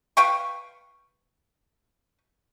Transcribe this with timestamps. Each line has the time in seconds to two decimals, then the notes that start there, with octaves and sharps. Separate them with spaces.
0.17 B4 F5 G5 C#6